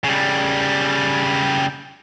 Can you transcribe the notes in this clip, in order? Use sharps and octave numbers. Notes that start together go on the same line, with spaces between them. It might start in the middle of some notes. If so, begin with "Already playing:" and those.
C#3 G3